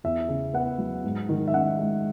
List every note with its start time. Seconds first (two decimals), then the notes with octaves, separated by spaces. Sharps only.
0.04 E2 E5
0.28 C#3
0.54 B3 F#5
0.78 F#3
1.04 G#2
1.29 D#3
1.48 E5
1.53 C#4 F#5
1.79 G#3